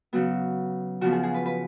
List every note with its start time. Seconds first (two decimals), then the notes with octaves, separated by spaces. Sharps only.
0.13 C#3 F#3 B3 F#4
1.01 C#3 F3 B3 F#4
1.12 G#4
1.23 G#4
1.34 B4
1.46 B4